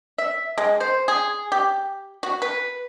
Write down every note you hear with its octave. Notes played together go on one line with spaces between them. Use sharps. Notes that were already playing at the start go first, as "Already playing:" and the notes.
E5
G#3
C5
G#4
G4
F#4
B4